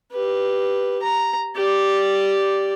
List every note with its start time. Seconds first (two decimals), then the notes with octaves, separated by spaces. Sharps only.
0.12 G4 B4
1.03 A#5
1.56 G4 D5